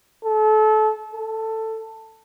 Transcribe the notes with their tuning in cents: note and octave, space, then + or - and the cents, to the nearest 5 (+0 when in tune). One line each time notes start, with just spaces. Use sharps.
A4 -30
A4 +10